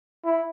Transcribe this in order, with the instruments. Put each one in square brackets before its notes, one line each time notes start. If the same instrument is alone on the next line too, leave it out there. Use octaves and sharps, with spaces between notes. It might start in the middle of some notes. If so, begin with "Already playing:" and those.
[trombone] E4